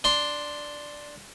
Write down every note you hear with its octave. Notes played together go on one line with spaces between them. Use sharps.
D4 C6